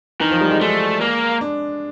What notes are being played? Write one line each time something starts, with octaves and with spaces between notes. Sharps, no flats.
D#3 E3
F3
G3
G#3
G#3 A3
A#3
D4